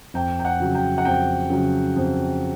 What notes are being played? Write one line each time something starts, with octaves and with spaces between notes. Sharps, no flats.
F2 G5
G5
F#5
C#3 F#3
G5
F#5
F2 G5
C#3 F#3
F2